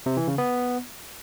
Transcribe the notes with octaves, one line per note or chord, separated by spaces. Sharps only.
C3
E3
C#3
B3